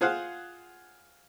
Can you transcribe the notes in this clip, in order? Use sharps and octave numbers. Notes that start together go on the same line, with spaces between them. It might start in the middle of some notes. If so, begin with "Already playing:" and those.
F4 G#4 C5 F5 F#5